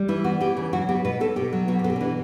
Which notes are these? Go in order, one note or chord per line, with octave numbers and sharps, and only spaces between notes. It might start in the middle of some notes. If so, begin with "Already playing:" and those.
Already playing: G3
E3 E4
B3 F#4
E3 G4
C#3
F#3 F#4
B3 G4
B2 B4
B2 A4
B2 G4
F#3
B2 F#4
G4
B2 A4
G4
C#4
E3 D4